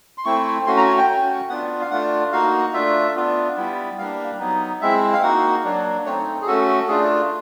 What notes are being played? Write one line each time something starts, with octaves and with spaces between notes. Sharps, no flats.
C6
A3 C4 E4 C#6
A3 C#4 F#4 C6
A#5
G#5
G5
A3 C#4 F#4
B3 D4 F4 F#5
F5
A3 D4 F4 F#5
A#3 D#4 F#4 F5
A3 D4 F4 E5
B3 D4 F4
G3 B3 E4
G3 A#3 D4 F5
F#3 B3 D#4
G#3 C4 E4 E5
F5
A#3 D#4 F#4 F#5
F#3 A#3 D4
A3 C4 D#4 C#5
G#4
A3 C#4 F#4 A4
A3 D4 F4 G#4